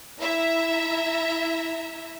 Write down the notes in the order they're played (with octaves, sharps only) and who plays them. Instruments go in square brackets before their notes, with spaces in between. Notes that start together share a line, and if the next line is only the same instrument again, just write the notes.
[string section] E4 E5 A#5